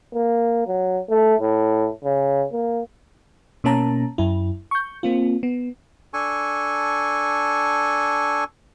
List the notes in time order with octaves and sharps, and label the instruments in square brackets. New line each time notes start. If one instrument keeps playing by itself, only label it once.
[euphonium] A#3
F#3
A3
A2
C#3
A#3
[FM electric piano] B2 A#3 C#4 A5 A#5
F#2 E4
C#6 G6
A#3 C4 F4
B3
[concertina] D4 A4 G#5 C#6